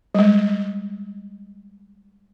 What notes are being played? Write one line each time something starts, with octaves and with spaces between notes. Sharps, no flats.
G3 G#3